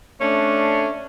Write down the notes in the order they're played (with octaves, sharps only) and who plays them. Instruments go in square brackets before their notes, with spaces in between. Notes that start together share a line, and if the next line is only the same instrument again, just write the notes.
[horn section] A3 C#4 D4